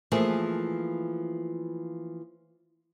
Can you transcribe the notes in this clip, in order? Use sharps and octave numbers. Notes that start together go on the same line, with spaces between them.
E3 F3 A3 A#3 G#4